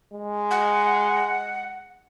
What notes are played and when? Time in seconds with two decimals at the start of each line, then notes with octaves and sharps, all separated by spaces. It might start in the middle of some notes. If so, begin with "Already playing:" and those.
0.13 G#3
0.51 F#5